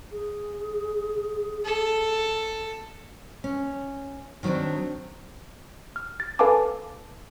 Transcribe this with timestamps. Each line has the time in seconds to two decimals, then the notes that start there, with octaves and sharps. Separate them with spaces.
0.11 G#4
1.65 A4
3.44 C#4
4.43 D#3 F#3 A#3 C4 D4
5.96 F6
6.20 A6
6.39 A4 B4 F5 G#5 A5 D6